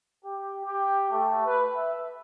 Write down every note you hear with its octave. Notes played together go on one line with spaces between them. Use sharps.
G4
G4
A3
B4
E5